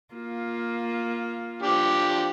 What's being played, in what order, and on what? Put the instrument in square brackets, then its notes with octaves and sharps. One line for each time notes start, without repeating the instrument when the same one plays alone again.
[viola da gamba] A#3 F4
[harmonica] F3 D4 G4